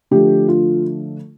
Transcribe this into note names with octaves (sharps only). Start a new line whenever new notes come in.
D3 F3 A3 G4
F4